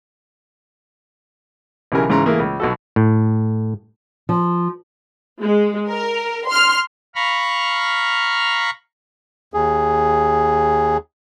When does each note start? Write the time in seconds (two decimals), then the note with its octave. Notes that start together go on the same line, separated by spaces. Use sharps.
1.92 B1 C#3 E3 G4 A#4 G#5
2.09 G#2 C#3 E3 A#5 C6
2.26 E3 A3 A#3 G#4
2.39 C#2
2.60 B1 F#4 A4
2.96 A2
4.29 F3
5.41 G#3
5.89 A#4
6.47 C6 F6
7.15 F5 A#5 B5 C#6 F6
9.54 D#2 G#4